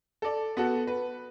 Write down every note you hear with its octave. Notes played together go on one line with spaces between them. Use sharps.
A4 D5
B3 F#4 A4
B4